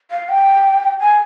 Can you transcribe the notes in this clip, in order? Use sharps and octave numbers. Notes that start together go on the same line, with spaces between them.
F5
G5
G#5